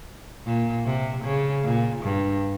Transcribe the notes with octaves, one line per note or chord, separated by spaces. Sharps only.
A#2
C3
C#3
A#2
G2